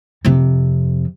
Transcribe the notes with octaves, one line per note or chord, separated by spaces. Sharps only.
F2 C3